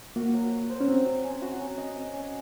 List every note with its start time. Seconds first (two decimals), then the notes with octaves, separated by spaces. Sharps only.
0.16 A#3 F#4
0.34 F#3
0.52 F#4
0.70 C5
0.81 C#4
0.88 F#3 C4
1.06 F#3
1.24 C#4
1.42 F#4
1.60 C#4
1.78 D#5
1.96 D#5
2.13 C#4